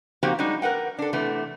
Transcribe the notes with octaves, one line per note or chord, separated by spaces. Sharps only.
F3 A#3 C4 D#4 F#4 G4
G3 G#3 D4 D#4 F#4
A#4 B4 F#5 G5
D4 A4
C3 E3 A3 B3